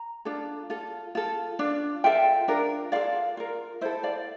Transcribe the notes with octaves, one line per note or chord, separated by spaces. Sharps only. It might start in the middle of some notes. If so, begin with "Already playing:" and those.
Already playing: A#5
D4 F4 A4
F4 A4
F4 A4
D4 F4
F4 A4 E5 G5
D4 F4 A#4
F4 A4 D5 F5
F4 A#4
E4 A4 C5 E5
D5 F5